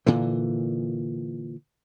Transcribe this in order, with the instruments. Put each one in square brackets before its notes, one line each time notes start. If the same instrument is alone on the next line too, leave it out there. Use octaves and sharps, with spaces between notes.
[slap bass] A#2 D3 E3